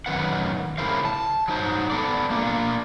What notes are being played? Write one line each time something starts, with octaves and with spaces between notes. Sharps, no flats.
F#2 D#3 B4 F#5
C#3 E4 A#4 C5 F5
A5
F#3 D#4 C5
B3 A4 D5
A#3 D4 F4